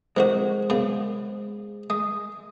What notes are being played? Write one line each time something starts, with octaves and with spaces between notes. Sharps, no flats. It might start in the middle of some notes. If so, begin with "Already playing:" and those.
F2 D#3 G#3 F#4 C5
F#2 C#3 B3
G#3 D#6